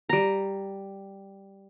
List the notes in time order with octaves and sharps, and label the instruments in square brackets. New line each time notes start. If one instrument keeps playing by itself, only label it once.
[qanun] G3 A#5